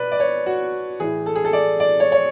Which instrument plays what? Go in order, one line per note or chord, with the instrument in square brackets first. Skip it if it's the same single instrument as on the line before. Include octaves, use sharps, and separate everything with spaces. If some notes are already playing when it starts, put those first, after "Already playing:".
Already playing: [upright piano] B2 B4 D5
D5
C#5
F#4
A2 E3 G#4
A4
G#4
A4
D5
D5
C#5
C#5